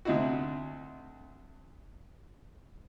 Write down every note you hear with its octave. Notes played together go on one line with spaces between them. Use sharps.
D2 C3 D#4 E4 F#4